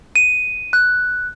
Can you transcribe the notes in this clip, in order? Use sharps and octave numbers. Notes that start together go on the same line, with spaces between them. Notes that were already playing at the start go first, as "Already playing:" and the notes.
D#7
F#6